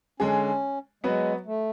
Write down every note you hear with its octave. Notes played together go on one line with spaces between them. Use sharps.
D3 G#3 C#4 D4 G#4
F#3 G#3 B3 F#4 B4
A3